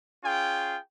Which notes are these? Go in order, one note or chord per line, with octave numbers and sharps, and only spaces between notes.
C#4 F4 G#4 G5